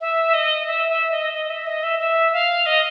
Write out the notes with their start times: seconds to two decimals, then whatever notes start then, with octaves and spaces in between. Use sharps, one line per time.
0.01 E5
0.34 D#5
0.67 E5
0.89 E5
1.11 D#5
1.33 D#5
1.50 E5
1.67 D#5
1.83 E5
1.99 E5
2.33 F5
2.66 D#5